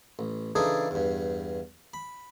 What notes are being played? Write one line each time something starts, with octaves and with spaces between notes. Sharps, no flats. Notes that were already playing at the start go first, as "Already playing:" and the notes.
A1
C#3 E3 D4 D#4 G#4 A4
E2 G2
B5